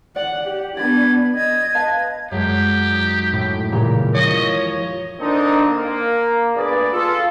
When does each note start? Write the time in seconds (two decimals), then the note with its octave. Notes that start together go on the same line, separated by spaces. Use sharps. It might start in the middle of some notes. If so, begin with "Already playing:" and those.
0.16 D5 F#5
0.47 G4
0.77 B3 D4 D5 B5 G#6
1.35 D#5 G#6
1.75 B4 F5 A5
2.31 F#2 F#3 G#3 G4
2.92 D#4
3.33 A2
3.72 A#2 C#3 E3 G4 A#4
4.15 F3 C#5 D#5
5.20 D3 A#3 C4 D4 D#4
5.69 A#3
6.56 G1 D2 G#4 B4 D5
6.92 F4 A4